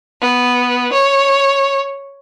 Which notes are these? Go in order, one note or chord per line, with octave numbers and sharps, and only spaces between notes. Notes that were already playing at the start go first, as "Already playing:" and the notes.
B3
C#5